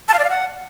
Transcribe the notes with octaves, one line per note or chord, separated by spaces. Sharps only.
A5
F5
D5
F5
F#5